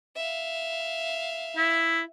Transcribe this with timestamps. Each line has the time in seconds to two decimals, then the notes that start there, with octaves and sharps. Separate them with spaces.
0.16 E5 F5
1.57 E4